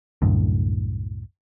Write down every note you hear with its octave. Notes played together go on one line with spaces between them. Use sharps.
C2 F#2 A2 D3